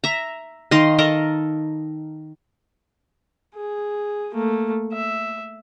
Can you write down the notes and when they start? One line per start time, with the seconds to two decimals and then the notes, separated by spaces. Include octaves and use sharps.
0.04 E5 A#5
0.71 D#3 D#5 F5 C6
0.99 A4 A#4 D#5
3.55 G#4
4.34 A3 A#3
4.93 E5